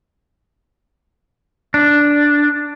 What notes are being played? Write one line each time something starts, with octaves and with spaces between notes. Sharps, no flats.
D4